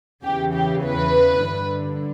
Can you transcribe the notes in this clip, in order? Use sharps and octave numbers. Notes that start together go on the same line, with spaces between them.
E2 C#3 E3 G4
G4
B4
G2 D3